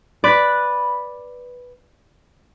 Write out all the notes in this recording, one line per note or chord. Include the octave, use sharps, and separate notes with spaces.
B4 D5